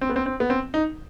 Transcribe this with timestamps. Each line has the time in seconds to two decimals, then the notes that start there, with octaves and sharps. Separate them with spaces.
0.01 C4
0.09 B3
0.16 C4
0.26 C4
0.40 B3
0.50 C4
0.74 D#4